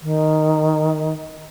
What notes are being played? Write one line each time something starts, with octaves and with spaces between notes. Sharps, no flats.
D#3